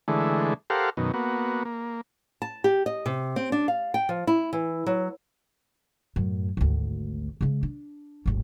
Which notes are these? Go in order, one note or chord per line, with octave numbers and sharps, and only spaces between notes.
D3 E3 G#3 A3
G4 A4 A#4 C5 F5 F#5
F#2 B2 D#3
A#3 B3 F#4
A#3
A5
G4
D#5
C3
C4
D4
F5
G5
F3
E4
E3
F#3
F#2 A2
G#1 D2
C#3 G#3
D4
D1 G#1